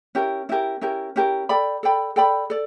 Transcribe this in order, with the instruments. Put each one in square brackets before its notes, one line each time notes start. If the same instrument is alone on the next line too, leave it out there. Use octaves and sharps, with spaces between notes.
[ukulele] C#4 E4 G4 A#4
C#4 E4 G4 A#4
C#4 E4 G4 A#4
C#4 E4 G4 A#4
A4 D5 G5 B5
A4 D5 G5 B5
A4 D5 G5 B5
A4 D5